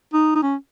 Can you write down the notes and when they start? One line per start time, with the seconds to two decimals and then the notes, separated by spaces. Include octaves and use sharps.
0.13 D#4
0.35 D#4
0.42 C#4